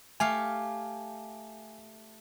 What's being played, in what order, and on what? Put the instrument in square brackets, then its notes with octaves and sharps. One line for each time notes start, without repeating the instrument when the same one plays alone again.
[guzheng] A3 G4 F5 [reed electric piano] G#5